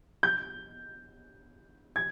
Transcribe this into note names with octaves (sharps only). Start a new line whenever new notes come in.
G6
G#6